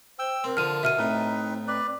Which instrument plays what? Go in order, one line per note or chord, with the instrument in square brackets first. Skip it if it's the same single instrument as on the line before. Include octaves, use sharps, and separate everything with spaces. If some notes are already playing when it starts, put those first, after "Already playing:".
[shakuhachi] C5 [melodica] G5 E6
[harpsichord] C4 [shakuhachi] A#4
[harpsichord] D3 F3 [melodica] A5 [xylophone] F6 D#7
[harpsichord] B2 [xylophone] E5 F6 D#7
[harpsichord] A2 [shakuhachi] C4 [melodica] D#4 B4
[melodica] B4 D5